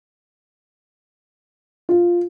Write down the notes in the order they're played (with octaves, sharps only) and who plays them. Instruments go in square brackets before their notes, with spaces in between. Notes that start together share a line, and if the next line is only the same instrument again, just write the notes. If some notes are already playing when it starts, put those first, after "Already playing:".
[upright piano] F4